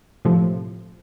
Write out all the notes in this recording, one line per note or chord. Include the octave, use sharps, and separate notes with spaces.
A2 C3 F3